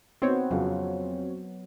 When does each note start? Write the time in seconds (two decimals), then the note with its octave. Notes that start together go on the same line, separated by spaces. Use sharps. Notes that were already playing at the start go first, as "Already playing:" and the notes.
0.22 B3 C4 D#4 F#4 C5 C#5
0.51 F2 C#3 F#3